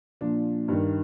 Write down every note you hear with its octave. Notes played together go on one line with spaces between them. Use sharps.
A#2 F3 D4
G2 D#3